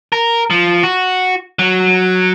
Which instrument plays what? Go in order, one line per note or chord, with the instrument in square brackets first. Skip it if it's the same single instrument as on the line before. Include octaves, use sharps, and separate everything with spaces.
[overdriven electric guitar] A#4
F3
F#4
F#3